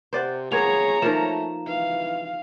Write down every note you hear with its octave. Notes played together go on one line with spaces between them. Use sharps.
C3 C5 D5 F#5
A#3 B3 G#4 C#5 A#5 G#6 F7
F3 A3 A#3 D#4 A#4 E7
E3 F5